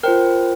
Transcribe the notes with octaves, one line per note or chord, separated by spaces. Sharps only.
F4 A#4 C5 G5